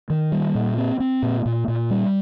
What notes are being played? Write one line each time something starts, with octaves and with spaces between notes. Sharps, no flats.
D#3
G3
A#2
C4
C4
A#2
A#2
A#2
G3